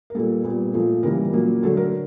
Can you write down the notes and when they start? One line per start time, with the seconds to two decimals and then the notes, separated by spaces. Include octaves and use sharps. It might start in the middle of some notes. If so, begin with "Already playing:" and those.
0.10 A#4
0.15 A#2 G3 A#3 A4
0.44 A#2 G3 B3
0.74 A#2 F3 A3
1.03 C#3 E3 G3 A#3 A#4
1.33 A#2 F#3 A#3
1.62 D3 F#3 A3 A4
1.77 A#4